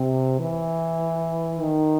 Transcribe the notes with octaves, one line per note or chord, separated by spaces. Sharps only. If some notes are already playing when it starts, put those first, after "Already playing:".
Already playing: C3
E3
D#3